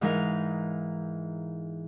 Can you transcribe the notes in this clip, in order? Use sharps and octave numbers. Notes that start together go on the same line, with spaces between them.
G#2 E3 G#3 D#4 A#4 F5